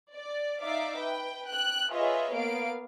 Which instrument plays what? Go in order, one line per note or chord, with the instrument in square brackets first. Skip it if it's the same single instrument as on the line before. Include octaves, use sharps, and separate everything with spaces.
[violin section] D5
D#4 D5 E5 F5 D6
B4 G5
G5 F#6
F4 G#4 B4 C#5 D#5 E5
A#3 B3 F5 D7